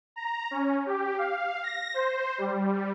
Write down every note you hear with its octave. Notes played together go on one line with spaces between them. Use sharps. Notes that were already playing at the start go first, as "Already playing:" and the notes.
A#5
C#4
G4
F5
A#6
C5
G3